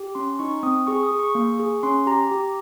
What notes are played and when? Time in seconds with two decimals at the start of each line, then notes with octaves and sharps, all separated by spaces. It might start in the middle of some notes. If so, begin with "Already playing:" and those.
Already playing: G4
0.15 C#4 C6
0.39 D#4 C#6
0.63 C4 D#6
0.87 G#4 C#6
1.03 D#6
1.11 G#4
1.19 C#6
1.35 A#3
1.60 G#4
1.83 C#4 C6
2.07 G4 A#5
2.31 G4